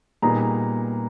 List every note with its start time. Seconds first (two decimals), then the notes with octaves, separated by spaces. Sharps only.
0.22 A#2 G3 B3 D#4 G#4 A#5